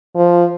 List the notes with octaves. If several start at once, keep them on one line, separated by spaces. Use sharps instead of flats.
F3